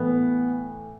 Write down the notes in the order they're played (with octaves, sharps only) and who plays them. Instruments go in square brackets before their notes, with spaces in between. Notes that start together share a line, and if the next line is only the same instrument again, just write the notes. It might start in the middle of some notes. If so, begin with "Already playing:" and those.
Already playing: [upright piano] A2 E3 B3